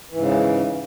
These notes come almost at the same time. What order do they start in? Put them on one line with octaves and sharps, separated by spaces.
E3 G#2 C#3